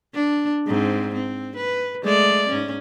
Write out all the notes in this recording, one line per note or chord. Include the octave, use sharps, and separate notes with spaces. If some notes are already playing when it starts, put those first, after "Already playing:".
D4
G#2 C4
C4
B4
G#3 A3 D5
G#2 C#4